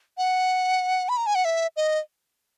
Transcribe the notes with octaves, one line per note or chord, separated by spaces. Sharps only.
F#5
B5
A#5
G#5
F#5
E5
D#5